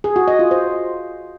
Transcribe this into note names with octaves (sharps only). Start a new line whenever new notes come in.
G#4
F#4
D#5
F4
C5